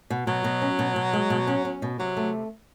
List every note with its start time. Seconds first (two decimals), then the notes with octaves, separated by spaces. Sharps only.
0.10 B2
0.27 B2 F#3
0.44 B2
0.62 C#4
0.79 B2
0.96 B2
1.13 G#3
1.30 B2
1.47 C#4
1.65 C#4
1.82 B2
1.99 C3 F#3
2.17 A3